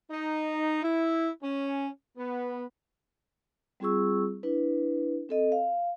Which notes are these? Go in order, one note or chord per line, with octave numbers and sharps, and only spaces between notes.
D#4
E4
C#4
B3
G3 C4 F4 G#4 C#6 E6
D4 E4 B4
C4 A4 D#5
F5